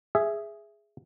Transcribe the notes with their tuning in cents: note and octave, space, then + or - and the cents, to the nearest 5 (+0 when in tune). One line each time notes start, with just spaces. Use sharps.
G#4 +0 E5 +5